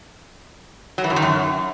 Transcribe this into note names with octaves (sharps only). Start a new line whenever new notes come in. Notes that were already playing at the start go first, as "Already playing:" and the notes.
F#3
E3
F#2
D#3
F#2